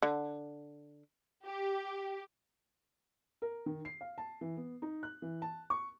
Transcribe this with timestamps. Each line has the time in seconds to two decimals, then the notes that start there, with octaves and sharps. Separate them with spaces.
0.02 D3
1.44 G4
3.42 A#4
3.66 D#3
3.85 C7
4.01 F5
4.18 A5
4.41 E3
4.57 B3
4.82 D#4
5.03 F#6
5.22 E3
5.42 A5
5.70 C#6